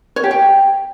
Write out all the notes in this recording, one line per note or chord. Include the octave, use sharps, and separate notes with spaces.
C#5
G4
G5